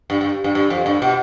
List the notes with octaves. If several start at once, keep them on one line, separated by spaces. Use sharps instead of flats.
G2
G2
G2
G2
F2
G2
B2